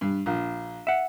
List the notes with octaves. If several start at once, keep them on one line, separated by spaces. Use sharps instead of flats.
G2
A#1
E5 F#5